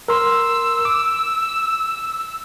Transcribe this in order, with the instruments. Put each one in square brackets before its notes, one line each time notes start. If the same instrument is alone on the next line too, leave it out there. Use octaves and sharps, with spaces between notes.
[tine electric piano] A#4 C6 [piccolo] E6
[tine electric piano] D6